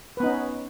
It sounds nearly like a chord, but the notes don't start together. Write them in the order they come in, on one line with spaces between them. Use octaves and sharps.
B4 B3 D#4 C#4